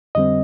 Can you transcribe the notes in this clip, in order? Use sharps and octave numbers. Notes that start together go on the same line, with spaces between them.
F2 D3 G3 C4 D#5